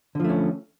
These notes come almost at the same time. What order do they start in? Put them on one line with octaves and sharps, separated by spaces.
D3 F3 A3 C#4